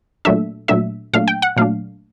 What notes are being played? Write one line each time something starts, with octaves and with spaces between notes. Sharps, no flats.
A#2 F#3 A3 D4 E5
A#2 F#3 A3 D4 E5
A#2 F#3 A3 D4 F5
G5
F#5
A#2 F#3 A3 D4 F5